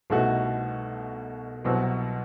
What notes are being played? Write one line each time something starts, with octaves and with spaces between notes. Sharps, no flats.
C2 B2 A3 D#4 F#4
C2 B2 F#3 C4